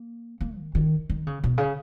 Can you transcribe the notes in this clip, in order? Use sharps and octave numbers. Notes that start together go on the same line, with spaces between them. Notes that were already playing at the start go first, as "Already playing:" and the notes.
Already playing: A#3
A#3
D#3
D#3
D#3
C#3
B2
C#3